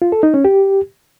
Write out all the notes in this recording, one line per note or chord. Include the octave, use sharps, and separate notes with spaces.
F4
A4
D#4
C#4
G4